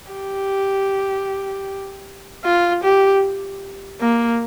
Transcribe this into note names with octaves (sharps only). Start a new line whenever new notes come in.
G4
F4
G4
A#3